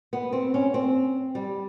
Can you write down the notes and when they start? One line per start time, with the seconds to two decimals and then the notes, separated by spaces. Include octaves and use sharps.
0.13 B3
0.33 C4
0.54 C#4
0.74 C4
1.35 G3